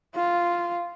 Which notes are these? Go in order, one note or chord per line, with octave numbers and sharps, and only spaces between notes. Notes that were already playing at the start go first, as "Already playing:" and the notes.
F4